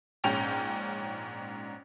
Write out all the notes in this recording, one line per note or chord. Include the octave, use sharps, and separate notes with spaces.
A#1 G#2 C#4 G5 F7